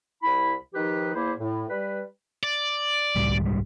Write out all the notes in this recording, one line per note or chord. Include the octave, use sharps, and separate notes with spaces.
C2 E4 B5
D#3 F3 D#4 G4 B4
E2 A#3 E4 C5
A2
G3 B4
D5
C#2 A2 G3
C2 G#2 G3